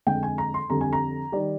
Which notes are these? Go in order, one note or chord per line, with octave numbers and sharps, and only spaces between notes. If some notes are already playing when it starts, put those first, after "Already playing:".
F2 D3 G#3 G5
G#5
A#5
C6
F2 D3 G3 A#5
G#5
A#5
D#3 G3 D5